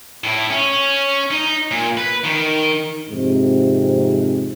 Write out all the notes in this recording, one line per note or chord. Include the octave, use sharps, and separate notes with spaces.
A2 E4
C#4
D#4
A#2
B4
D#3
F2 G#2 C3